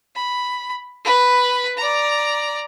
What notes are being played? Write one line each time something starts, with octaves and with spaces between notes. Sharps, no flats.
B5
B4 B5
D5 A#5